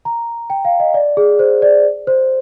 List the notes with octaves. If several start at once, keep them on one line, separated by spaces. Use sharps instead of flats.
A#5
G5
F5
D#5
D5
G#4
C5
D5
C5